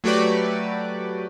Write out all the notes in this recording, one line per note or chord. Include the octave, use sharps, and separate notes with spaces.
F#3 A3 F#4 G4 B4 D5